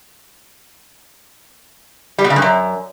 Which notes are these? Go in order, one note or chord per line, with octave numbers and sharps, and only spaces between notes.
G3
B2
C#3
G2
F#2